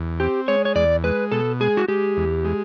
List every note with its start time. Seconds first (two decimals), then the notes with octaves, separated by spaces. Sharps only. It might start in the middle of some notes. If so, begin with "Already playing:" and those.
Already playing: E2
0.20 C4 G4
0.48 G#3 C#5
0.65 C#5
0.75 E2 D5
1.04 G#3 B4
1.32 B2 A4
1.60 G#3 G#4
1.77 F#4
1.88 G#3 G4
2.17 E2
2.45 G#3